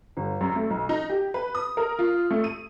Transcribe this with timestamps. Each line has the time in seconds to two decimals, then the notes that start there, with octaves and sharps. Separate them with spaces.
0.17 G1
0.41 F#2
0.56 A3
0.70 B1
0.89 D#4
1.10 G4
1.34 B4
1.55 D#6
1.77 A#4
1.99 F4
2.31 A3
2.44 D#7